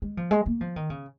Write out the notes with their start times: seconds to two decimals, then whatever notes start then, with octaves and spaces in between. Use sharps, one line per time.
0.02 G#3
0.17 F3
0.31 G#3
0.46 A#3
0.61 F3
0.76 D#3
0.90 C#3